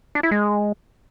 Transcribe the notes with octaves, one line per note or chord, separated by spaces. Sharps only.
D4
E4
G#3